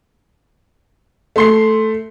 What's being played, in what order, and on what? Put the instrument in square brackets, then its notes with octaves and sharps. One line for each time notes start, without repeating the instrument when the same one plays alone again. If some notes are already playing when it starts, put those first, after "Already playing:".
[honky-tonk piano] A3 C6 C7